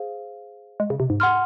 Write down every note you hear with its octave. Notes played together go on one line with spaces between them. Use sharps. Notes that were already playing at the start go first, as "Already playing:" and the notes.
Already playing: G#4 C5 F5
G#3
C#3
C3
G#2
F#5 C6 F6